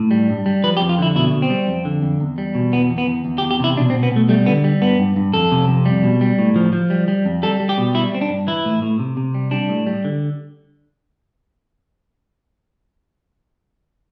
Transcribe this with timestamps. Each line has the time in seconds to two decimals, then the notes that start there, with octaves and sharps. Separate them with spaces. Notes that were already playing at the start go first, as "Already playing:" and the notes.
Already playing: A2
0.11 G3
0.29 G2
0.46 G3
0.64 F3 B4
0.77 G4
0.81 F2
0.89 F4
0.98 D3 E4
1.16 B2 E4
1.33 B2
1.42 C4
1.50 G3
1.68 F2
1.85 D3
2.02 F2
2.20 E2
2.38 G3
2.55 B2
2.72 E2 B3
2.90 E2
2.98 B3
3.07 E2
3.25 E2
3.38 G4
3.42 E2
3.51 G4
3.60 C3 E4
3.77 B2 D4
3.90 C4
3.94 B2
4.03 B3
4.12 B2 A3
4.29 G3 A3
4.46 D3 B3
4.64 G3
4.81 G2 B3
4.99 G2
5.16 G2
5.34 F2 A4
5.52 C3
5.68 F2
5.85 G3
6.03 B2
6.21 G3
6.39 A2
6.56 F3
6.73 F3
6.90 G3
7.08 G3
7.25 F2
7.43 G3 A4
7.60 G3
7.69 G4
7.78 B2
7.94 G3 E4
8.12 G3 C4
8.21 D4
8.29 G2
8.47 E3 E4
8.65 A2
8.82 A2
8.99 C3
9.17 C3
9.34 G3
9.51 G3 D4
9.69 A2
9.87 G3
10.05 D3